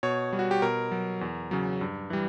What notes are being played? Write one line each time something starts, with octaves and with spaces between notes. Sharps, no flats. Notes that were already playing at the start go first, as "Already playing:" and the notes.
B2 C#5
G3
F#4
G4
B2 A#4
F#3
E2
C#3 F#3
G2
E3 G3